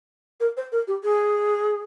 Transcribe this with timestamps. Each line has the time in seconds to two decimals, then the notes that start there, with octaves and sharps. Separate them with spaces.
0.40 A#4
0.57 C5
0.72 A#4
0.87 G4
1.03 G#4